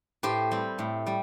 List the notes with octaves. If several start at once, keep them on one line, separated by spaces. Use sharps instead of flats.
A2 G4 C5
G3 C4
A2
G3